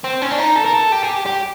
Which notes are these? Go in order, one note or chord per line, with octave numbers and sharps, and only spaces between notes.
C4
C#4
D4
D#4
A4
A#4
A4
G4
G#4
G4
G4